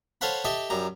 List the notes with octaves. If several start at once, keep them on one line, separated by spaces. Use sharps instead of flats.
A4 C5 C#5 F5 F#5 B5
G4 A4 D#5 E5
F#2 G3 A#5